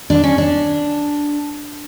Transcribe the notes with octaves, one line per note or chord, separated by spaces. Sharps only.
D4
C#4
D4